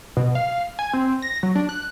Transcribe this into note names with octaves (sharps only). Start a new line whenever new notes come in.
B2
F5
G#5
C4
A#6
F#3
D4
F#6